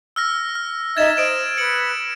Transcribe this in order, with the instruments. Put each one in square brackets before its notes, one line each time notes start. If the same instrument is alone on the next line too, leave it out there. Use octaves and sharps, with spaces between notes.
[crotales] E6 F6 A#6
F6
[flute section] D#4 D#5 E5 [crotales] G#6 A6 E7
[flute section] C5 [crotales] D#6 D7 E7
[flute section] B4 [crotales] C#7 F#7